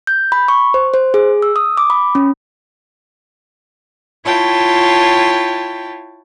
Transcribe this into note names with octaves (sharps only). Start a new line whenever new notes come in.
G6
B5
C#6
C5
C5
G#4
E6
D#6
D6
B5
C#4
E4 F4 C#5 G5 A5